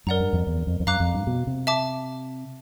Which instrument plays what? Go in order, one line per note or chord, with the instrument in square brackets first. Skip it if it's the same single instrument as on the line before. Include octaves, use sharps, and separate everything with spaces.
[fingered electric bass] F#2 [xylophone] A#4 D5 F#5 A#5
[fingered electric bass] G2
F2
E2
F2
F2
[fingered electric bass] F#2 [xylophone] F5 A#5 D6 F#6
[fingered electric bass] F2
G2
B2
C3
[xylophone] E5 A5 D6